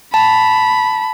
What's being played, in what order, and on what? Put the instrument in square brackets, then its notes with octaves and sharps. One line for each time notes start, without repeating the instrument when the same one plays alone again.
[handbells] A5 [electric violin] B5